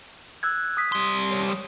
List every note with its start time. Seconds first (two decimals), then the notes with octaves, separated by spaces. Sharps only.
0.43 E6 F#6 G#6
0.77 D#6 B6
0.92 G3 C6
1.31 C#5